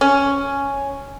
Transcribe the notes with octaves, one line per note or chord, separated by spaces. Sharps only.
C#4